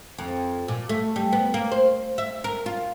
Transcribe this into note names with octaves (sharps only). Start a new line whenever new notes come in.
F2
A#2
A3
G3
B3
A#3
C5
E5
A#4
F4